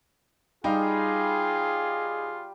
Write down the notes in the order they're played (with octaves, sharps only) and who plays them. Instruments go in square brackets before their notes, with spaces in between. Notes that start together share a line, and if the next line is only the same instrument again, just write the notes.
[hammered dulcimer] G3 [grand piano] D#4 F5 [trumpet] F4 [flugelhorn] G#4